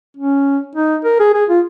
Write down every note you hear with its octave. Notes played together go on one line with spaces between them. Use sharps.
C#4
D#4
A#4
G#4
G#4
F4